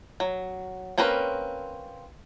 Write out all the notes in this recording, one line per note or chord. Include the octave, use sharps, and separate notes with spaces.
F#3
A#3 C4 C#4 A#4 B4